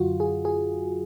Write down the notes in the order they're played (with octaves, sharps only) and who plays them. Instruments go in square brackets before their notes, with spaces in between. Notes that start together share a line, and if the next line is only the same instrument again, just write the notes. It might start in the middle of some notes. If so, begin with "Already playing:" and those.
Already playing: [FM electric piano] F#2 D3 F#3 F4 F#4
G#4
G#4